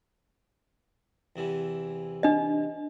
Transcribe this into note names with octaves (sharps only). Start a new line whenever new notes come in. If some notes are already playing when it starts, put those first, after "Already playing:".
E2 C3 E3
D4 D#5